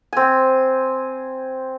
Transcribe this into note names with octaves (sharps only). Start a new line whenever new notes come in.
C4 G#5